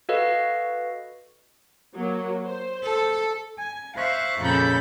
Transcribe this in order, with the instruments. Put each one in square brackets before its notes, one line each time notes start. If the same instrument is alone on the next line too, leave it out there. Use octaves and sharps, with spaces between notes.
[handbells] F#4 A4 B4 D#5 F5
[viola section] F#3 A#3
C5
[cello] A4
[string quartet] G#5
C5 E5 F5 C#6 F#6
F2 A#2 C#3 A4 B5 G6